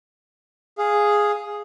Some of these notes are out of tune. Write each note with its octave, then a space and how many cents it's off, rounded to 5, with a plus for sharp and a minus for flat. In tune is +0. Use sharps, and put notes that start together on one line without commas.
G#4 +0 F5 +0